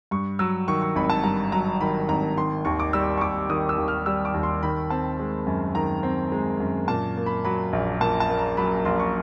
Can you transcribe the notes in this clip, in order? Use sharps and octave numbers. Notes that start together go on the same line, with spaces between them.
G2 C#6
F#3 E6
D#3 C#6
C#6
G#1 B5
A5
G2 A#5
F#3 A#5
D#3 B5
G#1 A#5
D#3 C6
D#2 C#6
D6
G3 E6
C#6
D#2 D6
D#3 D#6
E6
D#2
F6
G3 E6
D6
D#2
C6
D#3 B5
C4 A5
G#3
F#2
D#3 A#5
C4
G#3
F#2
A#2 A5
A#3
B5
F#3 B5
A#1
A#2 A5
A5
A#3
A#5
F#3 B5
A#1 C6
C#6